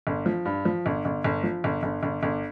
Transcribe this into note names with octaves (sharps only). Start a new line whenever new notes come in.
G1
F3
G2
F3
G1
G1
G1
F3
G1
G1
G1
G1